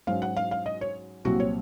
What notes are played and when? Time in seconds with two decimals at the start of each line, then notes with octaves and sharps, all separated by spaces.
0.07 G#2 F#3 C#4 F5
0.22 F#5
0.37 F5
0.51 F5
0.66 D#5
0.81 C#5
1.25 C2 A#2 F#3 C4 F#4
1.40 C#5